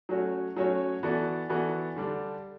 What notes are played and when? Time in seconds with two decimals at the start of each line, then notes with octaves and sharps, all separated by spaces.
0.09 F#3 A3 C#4 F#4 C#5
0.56 F#3 A3 C#4 F#4 C#5
1.03 E3 B3 F#4 A4 D5
1.49 E3 B3 F#4 A4 D5
1.96 D3 G3 D4